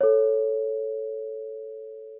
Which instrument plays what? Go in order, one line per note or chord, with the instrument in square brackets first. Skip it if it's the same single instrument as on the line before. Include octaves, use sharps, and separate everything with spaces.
[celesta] A4 C#5